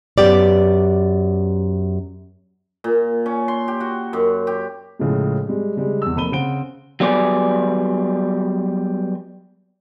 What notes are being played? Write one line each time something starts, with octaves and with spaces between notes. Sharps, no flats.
F#2 B3 G4 D5
A#2
C#4
C6
G4
F#4
F#2
G4
A2 C#3 F3 G#3
G3 G#3
C#3 G3 G#3
E2 E6
F1 A#3 B5 D#7 G7
C#3 C4 F#5 D7 G7
F#3 G3 B3 G#4 D5